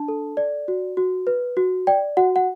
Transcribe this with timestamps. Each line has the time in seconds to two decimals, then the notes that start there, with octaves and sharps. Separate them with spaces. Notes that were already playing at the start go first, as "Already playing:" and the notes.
Already playing: D4 A5
0.08 A4
0.37 D5
0.68 F#4
0.97 F#4
1.27 B4
1.57 F#4
1.87 D5 G5
2.17 F#4 F#5
2.36 F#5